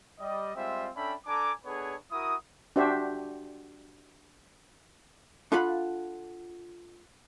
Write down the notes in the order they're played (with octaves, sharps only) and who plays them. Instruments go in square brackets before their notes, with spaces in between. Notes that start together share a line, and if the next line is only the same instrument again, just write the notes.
[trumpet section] G3 D5 D#5
G3 G#3 C4 F4 C5 E5
C#4 D4 A4 E5 G5 B5
D4 A4 G#5 A#5 D6
B3 D4 G#4 A4 B4 C#5
E4 F#4 A#4 D#6
[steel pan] D4 F#4 G4 C5 E5
[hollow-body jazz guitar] D4 F4 A4 F5 F#5 B5